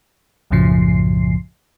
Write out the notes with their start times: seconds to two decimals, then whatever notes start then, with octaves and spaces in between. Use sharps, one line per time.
0.51 B1 F#2 A2 C#3 F3 C7